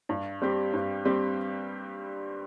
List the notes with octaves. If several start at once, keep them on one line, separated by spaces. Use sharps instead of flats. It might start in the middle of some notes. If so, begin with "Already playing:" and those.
G2
G3 C4 G4
G2
G3 C4 G4